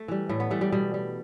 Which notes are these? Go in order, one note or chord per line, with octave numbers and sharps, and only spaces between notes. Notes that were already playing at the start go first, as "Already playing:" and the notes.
Already playing: A3
E3 G3
A2 A3
B3
E3 G3 A3
G3
B2 G3
G3